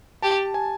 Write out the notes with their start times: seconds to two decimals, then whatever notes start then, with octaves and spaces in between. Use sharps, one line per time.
0.22 G4 A5
0.54 G#5